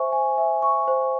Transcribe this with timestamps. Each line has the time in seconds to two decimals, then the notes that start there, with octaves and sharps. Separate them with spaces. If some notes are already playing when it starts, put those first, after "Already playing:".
Already playing: C5 E5 G#5 C#6
0.12 G#5
0.38 E5
0.62 C#6
0.88 C5